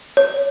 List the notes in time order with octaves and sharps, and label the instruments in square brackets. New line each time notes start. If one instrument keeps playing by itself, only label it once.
[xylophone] C#5